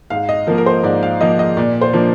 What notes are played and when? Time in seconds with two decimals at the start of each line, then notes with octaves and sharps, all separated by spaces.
0.10 G#2 F5
0.29 D#5
0.47 F3 A#3 A#4
0.58 A#4
0.66 C5
0.84 G#2 D5
1.03 F5
1.21 F3 A#3 D#5
1.39 D#5
1.57 A#2 D5
1.81 C5
1.93 F3 A#3 D4